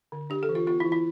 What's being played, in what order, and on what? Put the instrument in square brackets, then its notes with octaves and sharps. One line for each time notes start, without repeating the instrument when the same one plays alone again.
[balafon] D3
D4 G4
A4
E3
F4
B3 F4
E4
E3
E4